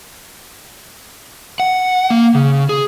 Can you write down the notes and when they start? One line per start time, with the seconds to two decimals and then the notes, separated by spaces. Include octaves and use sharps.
1.60 F#5
2.10 A#3
2.35 C#3
2.69 G#4